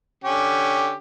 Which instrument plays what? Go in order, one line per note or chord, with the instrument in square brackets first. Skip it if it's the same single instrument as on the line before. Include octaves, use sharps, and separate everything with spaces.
[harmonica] D3 C#4 G4